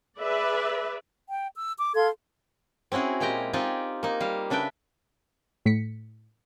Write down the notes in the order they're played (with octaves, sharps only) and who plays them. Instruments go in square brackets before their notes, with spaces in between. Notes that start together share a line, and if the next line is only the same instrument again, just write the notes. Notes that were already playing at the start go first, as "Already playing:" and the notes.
[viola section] G#4 B4 D5 E5
[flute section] G5
E6
D6
A4 F5 C6 G#6
[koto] C4 C#4 E4 F#4 G#4
A#2 G#3 G4 G5 A#5
C4 D#4 F4 G4 D5 G#5
A#3 D#4
G3 F5
C#3 D4 B4 E5 G5
[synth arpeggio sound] A2 B6 C#7